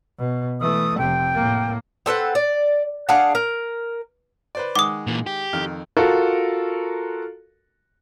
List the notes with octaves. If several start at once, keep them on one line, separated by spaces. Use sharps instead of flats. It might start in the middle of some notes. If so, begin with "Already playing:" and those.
B2
E3 A3 D#6
F1 C3 G5
A2 A#3
C4 A4 B4 F#5
D5
D4 G#4 F5 F#5
A#4
B4 C5 D5
D#3 G#3 F#5 D6 D#6
A#2 E3
G4
F2 D#3 F6
F4 F#4 A4 A#4